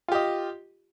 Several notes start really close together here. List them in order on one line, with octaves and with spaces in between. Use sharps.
F4 G4 D#5